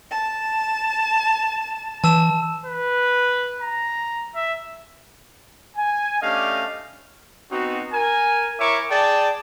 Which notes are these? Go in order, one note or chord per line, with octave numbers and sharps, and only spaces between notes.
A5
E3 A5 E6 E7
B4
A#5
E5
G#5
A3 C#4 D4 G4 D#5 F5
B3 C4 D#4 F#4
A#4 G#5
E4 A#4 C#5 E5 C#6 D6
G#4 D5 G5 A5